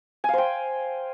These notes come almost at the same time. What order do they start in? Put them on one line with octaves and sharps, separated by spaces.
G#5 F5 C5 G5